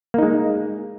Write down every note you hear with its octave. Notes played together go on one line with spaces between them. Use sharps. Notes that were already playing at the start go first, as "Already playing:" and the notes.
G#3 A#3 D#4